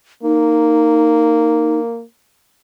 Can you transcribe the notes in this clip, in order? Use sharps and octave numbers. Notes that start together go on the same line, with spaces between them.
A#3 D#4